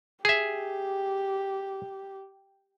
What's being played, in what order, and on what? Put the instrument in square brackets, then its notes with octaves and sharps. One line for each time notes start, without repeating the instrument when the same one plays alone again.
[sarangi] G4 [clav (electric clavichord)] G#4 E5